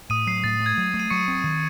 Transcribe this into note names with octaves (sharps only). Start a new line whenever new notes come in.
A2 D#6 D#7
F#3 C7
A2 A6
A3
G#6
F#3
A3
D#7
F#3 C#6 C#7
C4
D#3